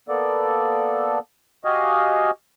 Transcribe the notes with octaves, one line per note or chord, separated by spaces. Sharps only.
A#3 B3 A4 D5
F#4 G4 D#5 F5 G#5